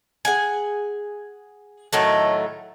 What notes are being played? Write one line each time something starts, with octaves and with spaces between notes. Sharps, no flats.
G#4 F#5 G#5
A2 D#3 F#3 A3